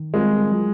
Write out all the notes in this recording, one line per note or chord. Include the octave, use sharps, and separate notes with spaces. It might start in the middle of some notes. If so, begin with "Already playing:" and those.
Already playing: D#3
G3 G#3 C4 F4 A#4
F#3